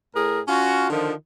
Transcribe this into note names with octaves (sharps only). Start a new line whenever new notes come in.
A2 G#4 A#4
C#4 F4 F#4
D3 D#3 F3